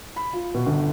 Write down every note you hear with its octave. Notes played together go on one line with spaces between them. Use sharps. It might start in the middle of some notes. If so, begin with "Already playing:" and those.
B5
F4
B2
G1